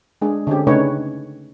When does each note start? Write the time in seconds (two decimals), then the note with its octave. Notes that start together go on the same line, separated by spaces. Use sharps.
0.22 G#3 D4 G#4
0.47 D3 C4 C#4 G4
0.67 C#3 A3 D4 D#4 B4 C#5